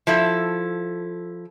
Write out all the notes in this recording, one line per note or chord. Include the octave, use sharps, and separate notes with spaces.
F3 E4 A4